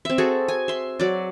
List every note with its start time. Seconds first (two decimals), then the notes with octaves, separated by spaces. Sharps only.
0.05 C4 E5
0.18 F#4 G#4 A4
0.48 G#5
0.68 E5 C6
1.00 F#3 D5